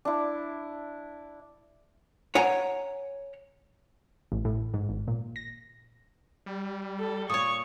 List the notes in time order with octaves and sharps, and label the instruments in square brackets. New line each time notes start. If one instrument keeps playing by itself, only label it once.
[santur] D4 E4
[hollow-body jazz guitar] C#5 F#5 G#5 A#5
[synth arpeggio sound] A1
A2
G#2
G#1
A#2
A#6
[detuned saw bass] G3
[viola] A4
[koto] A#2 C#5 [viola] C#6 [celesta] D#6